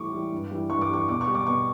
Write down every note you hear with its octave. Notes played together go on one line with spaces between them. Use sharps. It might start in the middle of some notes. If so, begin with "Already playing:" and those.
Already playing: A2 E3 G3 C#6 D6
E3 G3
G2
E3 G3
G2 C#6
D6
E3 G3 C#6
B2 D6
C#6
G3
D6
B2 C#6